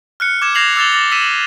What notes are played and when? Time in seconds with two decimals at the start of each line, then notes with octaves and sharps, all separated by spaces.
0.20 F6 F#6 C#7
0.42 D6 G#6 E7
0.55 G6 G#6 A#6 C7 F7 F#7
0.76 D6 E6 G#6 A6 F7 G7
0.93 D6 A6 A#6
1.11 E6 B6 D#7 E7